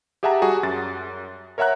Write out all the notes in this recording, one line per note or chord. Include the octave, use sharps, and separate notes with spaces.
G4 G#4 E5 F#5 A5 A#5
G3 F#4 G#4
F#2 A6
A#4 C#5 E5 F#5 A#5 F#6